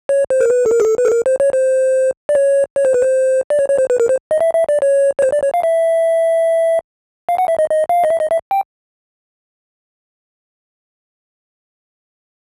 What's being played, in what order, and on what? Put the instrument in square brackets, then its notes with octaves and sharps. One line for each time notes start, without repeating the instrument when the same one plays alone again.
[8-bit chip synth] C#5
C5
A#4
B4
A4
A#4
G#4
A4
B4
A4
A#4
C5
C#5
C5
D5
C#5
C#5
C5
B4
C5
D5
C#5
C#5
C5
B4
A#4
C5
D#5
E5
E5
D5
C#5
C#5
C5
D5
C#5
F5
E5
F5
F#5
E5
D#5
D#5
F5
D#5
E5
D#5
E5
G5